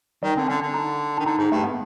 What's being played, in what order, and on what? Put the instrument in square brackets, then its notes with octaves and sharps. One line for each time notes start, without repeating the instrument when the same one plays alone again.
[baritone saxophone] D#3 [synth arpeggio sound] G3
[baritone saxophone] D3 [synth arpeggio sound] C4
[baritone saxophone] D3 [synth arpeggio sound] C#4
[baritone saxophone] D3
[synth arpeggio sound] D#4
[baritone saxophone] D#3 [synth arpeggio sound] D4
[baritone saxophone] D3 [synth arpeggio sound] D#4
[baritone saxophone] G#2 [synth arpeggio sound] D#4
[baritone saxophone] G2 [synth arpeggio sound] A3
[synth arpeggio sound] B3